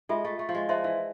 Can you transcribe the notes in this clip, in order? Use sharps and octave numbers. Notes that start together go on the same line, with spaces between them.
G#3 F4 A4 E5
A3
A3
F3
G#3
F3 C5 E5 A5 C6
E3